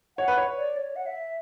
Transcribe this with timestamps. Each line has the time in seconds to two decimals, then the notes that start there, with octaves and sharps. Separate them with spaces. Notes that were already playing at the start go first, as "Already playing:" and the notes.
0.18 C#5 F#5
0.28 B4
0.38 C#5
0.58 D5
0.76 C#5
0.96 F#5
1.06 E5